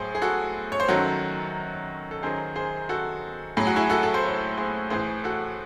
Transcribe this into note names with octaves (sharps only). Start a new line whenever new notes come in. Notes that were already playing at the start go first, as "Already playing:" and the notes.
Already playing: A2 F#3 G#4 C5
G#4
F#4 A4
C#5
C5
F#2 D#3 F#3 F#4 A4
A4
F#2 D#3 F#3 G#4 C5
G#4 C5
F#4 A4
A2 F#3 G#4
F#4
E4 G#4
F#4 A4
A4
C5
A4 C#5
G#4 C5
A2 E3 G#4 C5
F#4 A4